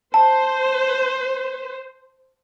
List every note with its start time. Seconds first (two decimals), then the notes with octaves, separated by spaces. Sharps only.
0.14 C5 A5